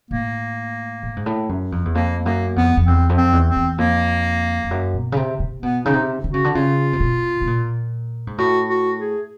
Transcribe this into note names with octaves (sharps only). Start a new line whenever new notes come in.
A2 A#3
A2
G#2
A2
F#2
F2
E2
F2 A#3
F#2 A#3
F2 B3
F2
E2 C4
F2
C4
E2
C4
E2
F2 A#3
F2
F#2
B2
C#3
C3
C3
B2 B3
C#3 D#4
C3
D3
C#3 F#4
D3
C#3 F4
C3
B2
B2
A#2
G#2
A2 F#4
F#4
G#4